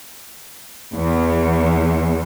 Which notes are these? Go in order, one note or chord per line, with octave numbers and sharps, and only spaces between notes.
E2